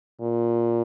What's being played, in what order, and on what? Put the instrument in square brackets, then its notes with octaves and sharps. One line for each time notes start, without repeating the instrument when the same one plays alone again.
[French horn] A#2